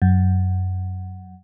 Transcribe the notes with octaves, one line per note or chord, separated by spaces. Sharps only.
F#2